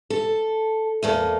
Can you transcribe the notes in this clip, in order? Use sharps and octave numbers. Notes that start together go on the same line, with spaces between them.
A4
E2 A3 A#3